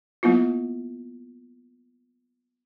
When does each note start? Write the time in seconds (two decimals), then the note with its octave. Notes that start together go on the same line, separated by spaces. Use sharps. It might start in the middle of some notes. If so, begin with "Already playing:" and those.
0.23 F#3 A#3 B3 E4 F4